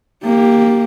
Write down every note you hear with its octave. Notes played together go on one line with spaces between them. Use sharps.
A#3 G4